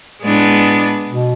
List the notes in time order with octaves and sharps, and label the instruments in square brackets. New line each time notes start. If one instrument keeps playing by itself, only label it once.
[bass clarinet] A2 [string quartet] G#3 B3 D4
[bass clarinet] B2